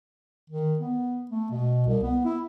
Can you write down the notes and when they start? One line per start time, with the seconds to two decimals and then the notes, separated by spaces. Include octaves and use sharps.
0.50 D#3
0.79 B3
1.31 A3
1.51 B2
1.86 C2
2.03 B3
2.25 E4